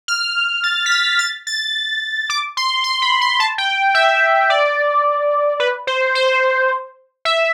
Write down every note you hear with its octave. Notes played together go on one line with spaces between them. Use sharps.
F6
A6
B6
A6
A6
A6
D6
C6
C6
B5
C6
A5
G5
E5
D5
B4
C5
C5
E5